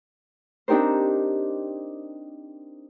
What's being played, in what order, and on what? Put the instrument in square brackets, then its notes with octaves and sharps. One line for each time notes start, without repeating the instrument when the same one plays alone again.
[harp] C4 D4 D#4 G4 A#4 C5